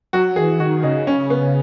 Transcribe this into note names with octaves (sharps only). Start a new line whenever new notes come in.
F#3 F#4
E3 G#4
D#3 F#4
C#3 D#4
C#4
B3